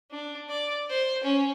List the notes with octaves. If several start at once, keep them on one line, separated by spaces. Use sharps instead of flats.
D4
D5
C5
C#4